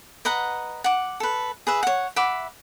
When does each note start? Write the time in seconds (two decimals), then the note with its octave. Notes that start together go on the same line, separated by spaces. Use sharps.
0.25 B4 D#5 F#5 A#5
0.84 F#5 D6
1.20 A4 B4
1.67 G#4 B4 E5
1.83 C#5 F#5
2.16 E5 F#5 B5 D6